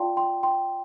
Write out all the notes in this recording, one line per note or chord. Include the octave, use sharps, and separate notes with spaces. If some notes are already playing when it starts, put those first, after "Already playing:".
Already playing: F4 D5 F5 G5 A5 C6
G5 C6
G5 C6